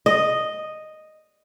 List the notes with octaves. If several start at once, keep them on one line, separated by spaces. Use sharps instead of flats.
D#5